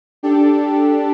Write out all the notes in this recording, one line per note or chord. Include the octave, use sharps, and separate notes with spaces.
D4 G4 A4